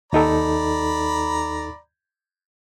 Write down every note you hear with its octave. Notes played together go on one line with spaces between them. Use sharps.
D#2 D#4 A4 D5 A#5 B5